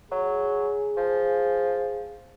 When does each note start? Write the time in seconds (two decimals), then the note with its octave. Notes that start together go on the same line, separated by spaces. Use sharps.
0.12 F#3 G#4
0.97 F3